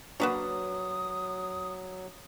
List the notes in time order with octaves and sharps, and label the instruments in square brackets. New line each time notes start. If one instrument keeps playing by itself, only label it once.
[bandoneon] F#3 [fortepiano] A#3 D4 [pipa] F#4 B4 C#5 [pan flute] D#6